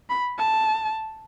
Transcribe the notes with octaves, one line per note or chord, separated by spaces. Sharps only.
B5
A5